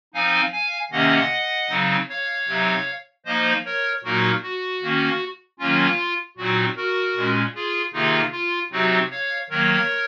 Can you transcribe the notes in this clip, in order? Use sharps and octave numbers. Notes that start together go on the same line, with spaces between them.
F3 C4 D#4 F5 G#5
F5 G#5
C3 D#3 A#3 C#4 D#5 F#5
C#3 F#3 C4 D#4
C#5 F5
C3 F#3 C4 D#4
F3 A#3 D#4 C5 D#5
A#4 C#5
A#2 F#3 A#3 D#4 F#4 A#4
F#4
D#3 A#3 C#4
D#3 F#3 A#3 C#4 F4
A#2 F#3 C4 D#4 F#4
F#4 A#4
A#2 G#3 C#4
F4 G#4
C3 D#3 A#3 D#4 F4 G#4
F4
C3 F#3 C4 D#4 F#4
C#5 F5
D#3 F#3 A#3 A#4 C#5